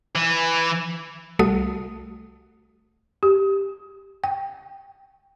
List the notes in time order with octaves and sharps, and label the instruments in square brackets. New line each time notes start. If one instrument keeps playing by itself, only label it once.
[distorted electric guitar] E3
[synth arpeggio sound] C2 G3 A3 F#4 D#6
[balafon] G4
G5